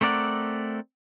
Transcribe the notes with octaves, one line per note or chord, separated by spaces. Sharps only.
A3 C4 A#4 D5 F#5